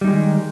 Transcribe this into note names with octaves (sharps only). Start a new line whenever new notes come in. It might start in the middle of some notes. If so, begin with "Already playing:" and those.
D#3 G3 G#3 D#4